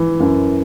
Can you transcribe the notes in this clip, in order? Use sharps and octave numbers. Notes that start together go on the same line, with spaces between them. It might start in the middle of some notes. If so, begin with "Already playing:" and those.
Already playing: E3
F#2